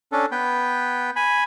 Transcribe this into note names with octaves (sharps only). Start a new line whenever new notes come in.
C#4 D4 A4
B3 B4 G5
G#5 B5